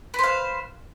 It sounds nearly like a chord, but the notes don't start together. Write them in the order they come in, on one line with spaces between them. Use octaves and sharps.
B4 C5 F5